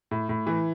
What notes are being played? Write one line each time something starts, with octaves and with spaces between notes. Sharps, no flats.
A2
A2
E3